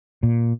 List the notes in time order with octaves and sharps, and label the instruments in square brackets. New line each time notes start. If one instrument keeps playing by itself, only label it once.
[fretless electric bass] A#2